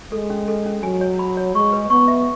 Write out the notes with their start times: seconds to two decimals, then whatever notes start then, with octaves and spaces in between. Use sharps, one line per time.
0.12 G#3 A4
0.30 C#4
0.48 A4
0.66 C#4
0.83 F#3 G#5
1.01 C#5
1.19 B5
1.37 C#5
1.55 G#3 C#6
1.73 B4
1.90 B3 C#6
2.08 E5